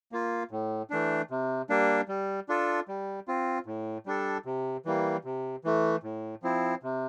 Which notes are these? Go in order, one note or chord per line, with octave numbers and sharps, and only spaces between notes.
A#3 F4
A2
E3 A3 D4
C3
G3 A#3 D4
G3
D4 F4 A4
G3
C4 F4
A2
G3 D4 A4
C3
E3 G3 A#3
C3
E3 A3
A2
F3 C4 E4
C3